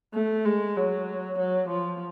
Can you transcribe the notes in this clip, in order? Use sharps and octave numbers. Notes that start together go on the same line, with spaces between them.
A3
G#3
F#3
F#3
F3